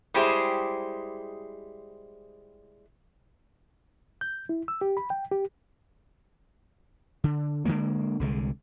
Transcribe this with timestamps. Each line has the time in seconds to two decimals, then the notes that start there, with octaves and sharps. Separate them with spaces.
0.14 G3 G#3 E4 G4 G#4 C5
4.21 G6
4.49 E4
4.68 E6
4.81 G4
4.97 B5
5.10 G5
5.31 G4
7.24 D3
7.65 D3 F#3 G#3 A#3
8.20 C2 D3 E3 G#3